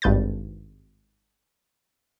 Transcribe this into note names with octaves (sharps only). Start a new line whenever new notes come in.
G#1 G2 B4 G6 A6